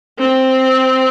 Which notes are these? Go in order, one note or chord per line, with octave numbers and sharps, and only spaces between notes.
C4